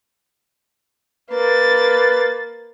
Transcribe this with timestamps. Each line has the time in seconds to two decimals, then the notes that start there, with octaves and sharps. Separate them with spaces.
1.31 A#3 B4 A6